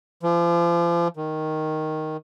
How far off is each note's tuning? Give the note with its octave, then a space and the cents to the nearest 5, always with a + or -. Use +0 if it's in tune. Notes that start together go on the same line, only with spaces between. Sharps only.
F3 -35
D#3 +0